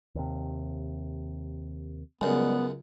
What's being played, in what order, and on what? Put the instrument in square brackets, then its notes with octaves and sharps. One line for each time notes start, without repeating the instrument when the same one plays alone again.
[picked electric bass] D#2 C3
[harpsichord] C#2 F#2 [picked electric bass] G3 G#3 [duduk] B3